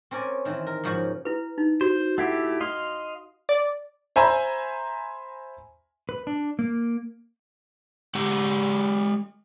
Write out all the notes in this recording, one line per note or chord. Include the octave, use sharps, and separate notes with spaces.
C4 C#4 A#4 D5 G#5
D#3 E3 C4
A#4
G#2 C#3 F3 G#3 F#4
E4 B4
D#4
F#4 C5
A3 E4 G4 F#5
D#5 F5 C6
D5
C5 E5 G#5 A#5 B5
B4
D4
A#3
G#3 G4 F#5